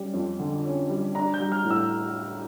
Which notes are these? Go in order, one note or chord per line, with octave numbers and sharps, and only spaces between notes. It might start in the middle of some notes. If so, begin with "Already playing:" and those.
Already playing: G3 C#4
F2
D3
C#4
G3
D4 A#5
G6
G3
F6
A2
E6